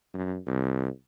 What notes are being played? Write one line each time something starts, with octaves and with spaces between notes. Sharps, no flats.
F#2
C2